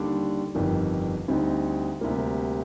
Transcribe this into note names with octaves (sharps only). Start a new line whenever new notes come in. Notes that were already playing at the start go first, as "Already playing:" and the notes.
Already playing: D#2 D3 G3 D4
G1 F2 D#3 G3 D4
D2 D3 G3 C4 D#4
D2 C3 G3 A#3